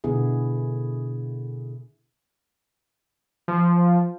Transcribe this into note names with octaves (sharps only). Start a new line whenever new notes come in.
B2 D3 B3 E4 G#4
F3